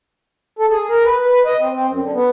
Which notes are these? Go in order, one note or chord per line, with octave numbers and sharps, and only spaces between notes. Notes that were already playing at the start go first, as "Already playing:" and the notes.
A4
G#4
A#4
B4
B4
D#5
C4
C4
F#2
D3
B3